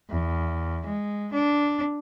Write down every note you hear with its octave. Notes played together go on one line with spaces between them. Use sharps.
E2
G#3
D4